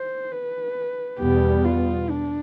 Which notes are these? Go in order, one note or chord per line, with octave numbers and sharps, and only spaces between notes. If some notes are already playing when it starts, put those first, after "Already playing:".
Already playing: C5
B4
E2 B2 G3 B3 G4
F4
D4